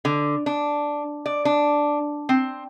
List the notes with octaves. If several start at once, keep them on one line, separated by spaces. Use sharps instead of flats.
D3
D4
D5
D4
C4